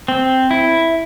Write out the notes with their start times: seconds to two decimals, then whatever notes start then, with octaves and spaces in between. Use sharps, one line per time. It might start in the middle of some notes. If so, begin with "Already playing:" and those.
0.08 C4
0.51 E4